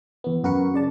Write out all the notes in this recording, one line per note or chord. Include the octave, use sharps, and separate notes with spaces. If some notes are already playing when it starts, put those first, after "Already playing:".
E2 B3
F#2 F#4 A#4 B4 C#7
C#3 D5 A5